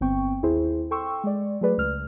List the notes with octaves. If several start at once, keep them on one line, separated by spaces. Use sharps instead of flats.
G1 B3 C4 G5 C#6
D#2 E4 G#4 C5
A4 G5 C6 C#6 E6
G#3 D5
F#3 A3 G#4 B4 D5
C#2 F6